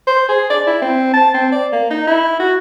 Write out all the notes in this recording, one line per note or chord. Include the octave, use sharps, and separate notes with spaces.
C5
G#4
D5
E4
C4
A5
C4
D5
A#3
D#4
E4
F#4